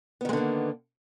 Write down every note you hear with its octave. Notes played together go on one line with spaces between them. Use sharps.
D3 D#3 G#3 A#3 B3